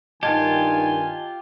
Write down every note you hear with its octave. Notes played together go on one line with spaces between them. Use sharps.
G2 D#3 F4 G4 D#5 G#5 A5 G#6